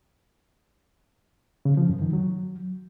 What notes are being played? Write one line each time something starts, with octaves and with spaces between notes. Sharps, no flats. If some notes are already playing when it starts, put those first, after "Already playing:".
C#3
F3
F#2
D#3
F#3